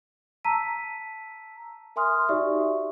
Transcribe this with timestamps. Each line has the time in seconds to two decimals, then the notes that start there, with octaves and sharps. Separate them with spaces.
0.45 A5 A#5 E6 B6 D#7
1.96 A#4 E5 G#5 C6 D#6 F6
2.29 D#4 F#4 G4 D5 E5 C#6